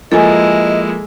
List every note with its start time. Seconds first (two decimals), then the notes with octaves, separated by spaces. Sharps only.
0.12 F3 G#3 A#3 E4 A4 D#5 G#5